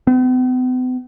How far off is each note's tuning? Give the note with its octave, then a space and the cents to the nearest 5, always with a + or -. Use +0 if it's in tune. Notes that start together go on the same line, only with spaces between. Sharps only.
B3 +45